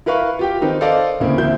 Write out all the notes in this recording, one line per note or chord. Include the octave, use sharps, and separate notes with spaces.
E4 A#4 B4 F5 C#6
F4 G4 G5
D#3 C4 D#4 A#4 B4
A4 C5 D5 D#5 F5
D2 A2 C#3 A#3 C4
D2 A#3 C4 E4 G6